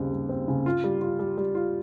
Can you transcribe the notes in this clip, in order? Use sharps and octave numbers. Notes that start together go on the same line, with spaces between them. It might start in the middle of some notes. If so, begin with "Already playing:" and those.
Already playing: D#2 C#3 G3 C4
G3
C4
C#3
F4
G3
F4
G3
G3
F4